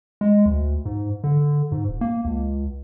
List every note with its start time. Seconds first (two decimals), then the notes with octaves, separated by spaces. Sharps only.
0.21 G#3
0.46 D2
0.85 G#2
1.24 D3
1.72 G#2
1.88 D#1
2.01 A#3
2.25 C#2